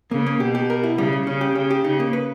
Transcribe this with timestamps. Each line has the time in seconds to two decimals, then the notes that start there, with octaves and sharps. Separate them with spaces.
0.11 C#3 A#3
0.26 A#3
0.40 B2 G4
0.55 G4
0.70 A#4
0.83 E4
0.98 C#3 G3
1.13 G3
1.27 C#3 C#4
1.41 G4
1.55 C#3 C#4
1.70 G4
1.84 C#3 D#4
2.00 A#3
2.13 B4